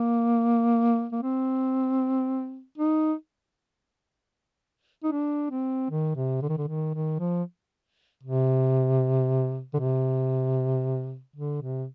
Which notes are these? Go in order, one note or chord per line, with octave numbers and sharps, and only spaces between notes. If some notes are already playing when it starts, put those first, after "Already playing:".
Already playing: A#3
A#3
C4
D#4
D#4
D4
C4
D#3
C3
D3
D#3
D3
D#3
D#3
F3
C3
D3
C3
D3
C3